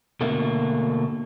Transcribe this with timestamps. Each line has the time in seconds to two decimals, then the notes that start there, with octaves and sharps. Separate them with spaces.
0.21 B2 D3 A3 A#3